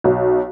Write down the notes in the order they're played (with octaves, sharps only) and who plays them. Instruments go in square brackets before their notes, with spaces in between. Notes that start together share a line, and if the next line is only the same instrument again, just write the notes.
[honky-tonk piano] B1